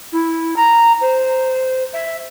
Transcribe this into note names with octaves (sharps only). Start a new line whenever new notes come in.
E4
A#5
C5
E5